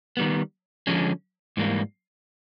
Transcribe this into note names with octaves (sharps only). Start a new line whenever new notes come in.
D#3 G3 B3
D3 F3 G#3 C#4
G#2 E3 G3 A#3